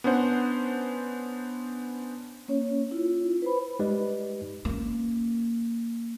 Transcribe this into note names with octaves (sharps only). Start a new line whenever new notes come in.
B3 C#4 D4 C5 F#5
A#3 C#4 C#5
E4 F4
B4 C5 B5
G#3 D#4 G4 B4 D5 D#5
A#3 C#4